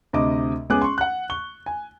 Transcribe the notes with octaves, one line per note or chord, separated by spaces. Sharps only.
D2 C3 D#5 D6
G#3 B3 C#4 G#4 D6 F#6
C6 C#6
F#5 F#6
C#6 G7
G#5